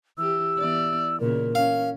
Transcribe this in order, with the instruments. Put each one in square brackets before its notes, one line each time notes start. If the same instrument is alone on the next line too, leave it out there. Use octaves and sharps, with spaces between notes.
[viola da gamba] E3 G4 [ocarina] E6
[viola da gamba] E3 B3 D5
[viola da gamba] A#2 C#3 [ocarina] A#4
[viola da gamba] C#4 [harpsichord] F5